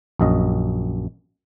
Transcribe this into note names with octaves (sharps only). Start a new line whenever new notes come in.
A#1 F#2 D#5